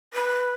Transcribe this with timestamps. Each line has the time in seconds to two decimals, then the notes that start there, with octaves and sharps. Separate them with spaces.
0.13 B4